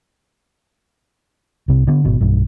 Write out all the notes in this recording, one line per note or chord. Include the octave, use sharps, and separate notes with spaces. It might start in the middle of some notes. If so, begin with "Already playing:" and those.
C2 C3
D3 B3
G#1 B2
B1 G2